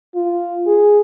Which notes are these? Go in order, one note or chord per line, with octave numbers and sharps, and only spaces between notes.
F4
G#4